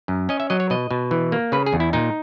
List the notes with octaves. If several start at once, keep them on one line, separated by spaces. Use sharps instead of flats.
F#2
C#4 D#5
E5
F#3 D#5
C#5
B2 D#5
B2
E3
A#3
C#3 B4
G#4
E2
E4
A#2 D#4